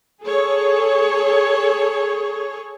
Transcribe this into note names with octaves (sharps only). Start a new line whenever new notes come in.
G#4 A4 C#5